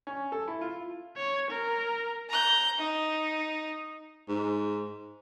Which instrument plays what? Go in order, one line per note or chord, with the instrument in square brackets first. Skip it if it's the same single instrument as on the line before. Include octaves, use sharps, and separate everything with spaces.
[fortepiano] C#4
A4
E4
F4
[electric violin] C#5
A#4
[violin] A#5 G6
D#4
[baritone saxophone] G#2